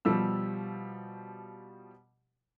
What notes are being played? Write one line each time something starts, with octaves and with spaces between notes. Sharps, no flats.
B2 F3 G3 G4 E6